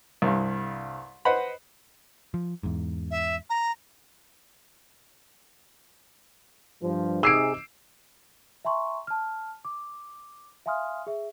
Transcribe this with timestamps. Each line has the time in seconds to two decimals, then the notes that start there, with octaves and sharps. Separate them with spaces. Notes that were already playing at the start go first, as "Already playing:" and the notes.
0.22 C2 G2
1.25 B4 C5 D#5 F#5 B5
2.34 F3
2.63 E2 G#2
3.11 E5
3.50 A#5
6.83 G2 F3
7.23 C3 D#4 G#4 D6 E6 C7 D7
8.65 E5 G#5 A#5 C6 C#6
9.07 A5 F6
9.65 D6
10.66 E5 F5 G#5 C6 D#6 F6
11.07 G#4 E5